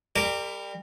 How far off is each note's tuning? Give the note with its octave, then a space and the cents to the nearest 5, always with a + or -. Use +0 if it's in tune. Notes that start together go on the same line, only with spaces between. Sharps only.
G3 +25 A#4 -25 D6 +0